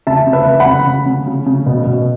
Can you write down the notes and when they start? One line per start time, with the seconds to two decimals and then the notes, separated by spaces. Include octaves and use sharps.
0.07 C#3 E5 A5
0.27 C#3
0.33 B4 E5
0.46 C#3
0.60 F#5 B5
0.66 C#3
0.86 C#3
1.06 C#3
1.27 C#3
1.46 C#3
1.66 B2
1.86 B2